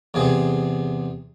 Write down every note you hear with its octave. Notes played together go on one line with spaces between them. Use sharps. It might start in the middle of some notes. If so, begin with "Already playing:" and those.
E2 C3 G#4